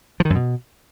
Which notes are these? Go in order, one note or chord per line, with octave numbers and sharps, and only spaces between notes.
F3
D#3
F#2
B2